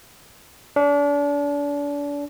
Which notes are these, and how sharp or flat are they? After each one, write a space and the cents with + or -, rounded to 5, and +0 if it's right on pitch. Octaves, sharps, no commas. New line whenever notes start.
D4 -35